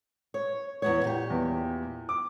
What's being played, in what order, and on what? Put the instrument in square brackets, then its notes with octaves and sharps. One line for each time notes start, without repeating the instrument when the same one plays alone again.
[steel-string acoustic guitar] C#5
E2 B3 C#5
A#2 G4
[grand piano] E2
D6